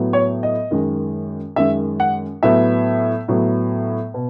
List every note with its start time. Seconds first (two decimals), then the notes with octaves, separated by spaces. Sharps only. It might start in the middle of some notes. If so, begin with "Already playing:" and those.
Already playing: A2 F#3 B3
0.13 C#5
0.43 D#5
0.71 F#2 D#3 G#3
1.56 F#2 D#3 G#3 E5
2.00 F#5
2.43 A2 F#3 B3 E5
3.28 A2 F#3 B3
4.14 B2